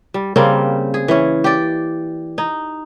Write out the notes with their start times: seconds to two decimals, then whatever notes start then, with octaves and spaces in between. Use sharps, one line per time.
0.14 G3
0.36 C#3 G3 A#3 C4
0.94 G#4
1.08 E3 C#4
1.44 G4 D5
2.38 D#4